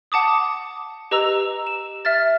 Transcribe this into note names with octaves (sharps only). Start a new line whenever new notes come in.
F#5 A5 D6 D#6
G4 B4 D#5 A#5 E6 F7
E7
E5 F6 A6